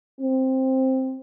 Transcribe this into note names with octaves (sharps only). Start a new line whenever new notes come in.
C4